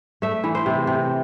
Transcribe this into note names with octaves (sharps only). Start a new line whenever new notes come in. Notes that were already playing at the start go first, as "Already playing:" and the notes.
A3 E5
E3
C5
C3
C3